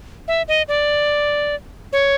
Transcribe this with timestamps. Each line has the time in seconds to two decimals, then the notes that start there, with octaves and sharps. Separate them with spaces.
0.28 E5
0.48 D#5
0.68 D5
1.93 C#5